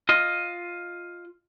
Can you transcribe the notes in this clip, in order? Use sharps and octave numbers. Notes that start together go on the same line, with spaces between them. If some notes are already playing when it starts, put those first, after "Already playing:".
F4 D#5